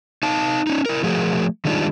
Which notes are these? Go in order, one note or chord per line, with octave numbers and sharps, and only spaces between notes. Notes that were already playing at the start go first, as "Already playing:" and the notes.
D#4 F5 A5
C#4 D#4
E4 A#4
F3 A3 F#4 G#4 A#4
D#3 G3 G#3 D4 D#4 F4